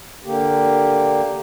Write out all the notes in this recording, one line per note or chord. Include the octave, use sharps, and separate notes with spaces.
D3 A#3 G4